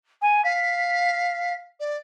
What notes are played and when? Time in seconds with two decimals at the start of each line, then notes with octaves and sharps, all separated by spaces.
0.21 G#5
0.44 F5 B6
1.80 D5